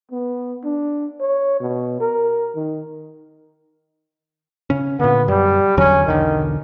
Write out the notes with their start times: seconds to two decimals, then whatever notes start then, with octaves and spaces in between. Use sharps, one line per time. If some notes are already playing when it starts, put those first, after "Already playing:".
0.11 B3
0.64 D4
1.20 C#5
1.61 B2
2.00 A#4
2.56 D#3
4.70 C#3 C#4
5.00 A#2 D3 B3
5.28 F#2 G3
5.77 E2 D3 F#3 C#4
6.07 B1 E2 D3 D#3